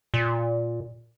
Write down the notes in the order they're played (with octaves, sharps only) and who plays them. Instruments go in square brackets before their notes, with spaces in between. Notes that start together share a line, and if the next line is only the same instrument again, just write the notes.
[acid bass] A#2